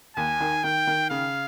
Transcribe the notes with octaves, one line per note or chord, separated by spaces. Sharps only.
D#2 G#5
D#3
D#3 G5
D#3
C#3 F5